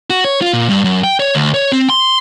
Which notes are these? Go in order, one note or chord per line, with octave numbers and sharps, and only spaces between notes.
F#4
C#5
F4
A#2
G2
F#2
G5
C#5
D2
C#5
C4
C6